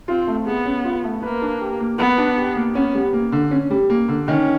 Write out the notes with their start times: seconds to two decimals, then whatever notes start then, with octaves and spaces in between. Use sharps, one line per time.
0.08 C4 F4
0.27 A3
0.46 B3 G#4
0.66 C#4
0.85 F4
1.04 A3
1.23 A#3 B4
1.42 D4
1.61 G4
1.80 A#3
1.98 B3 B4
2.18 D4
2.37 G4
2.56 A#3
2.75 B3 C#4
2.95 G3
3.13 A#3
3.32 D3
3.51 C#4
3.70 G3
3.90 A#3
4.08 D3
4.27 D#3 C#4